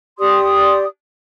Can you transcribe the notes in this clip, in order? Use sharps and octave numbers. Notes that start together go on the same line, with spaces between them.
G4 D5 C6 D#6